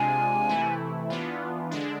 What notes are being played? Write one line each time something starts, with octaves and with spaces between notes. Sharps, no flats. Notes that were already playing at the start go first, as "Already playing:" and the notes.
Already playing: C3 G#3 D4 F4 G#5
C3 E3 A3 E4
E3 B3 D4 F4
D3 G#3 D4